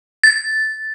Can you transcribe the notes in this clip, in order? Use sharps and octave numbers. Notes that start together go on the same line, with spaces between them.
A6